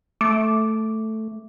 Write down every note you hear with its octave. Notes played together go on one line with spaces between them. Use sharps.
A3 D6